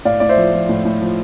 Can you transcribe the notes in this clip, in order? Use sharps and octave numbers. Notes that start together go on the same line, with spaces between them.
A2 D5 F5
A2 D5
C5 E5
F3
F3
A2
A2
F3